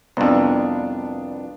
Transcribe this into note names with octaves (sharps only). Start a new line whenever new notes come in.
C2 F2 B3 D4 D5 F5